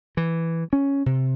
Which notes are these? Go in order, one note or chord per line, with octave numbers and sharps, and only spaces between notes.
E3
C#4
C3